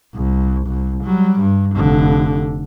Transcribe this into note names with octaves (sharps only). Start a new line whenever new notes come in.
C2
C2
F#3 G3
G2
F1 D3